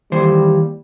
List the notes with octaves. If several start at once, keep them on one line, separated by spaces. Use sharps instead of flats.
D#2 E3 G3 C5